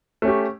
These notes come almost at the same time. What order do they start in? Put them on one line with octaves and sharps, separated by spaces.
A3 C#4 G4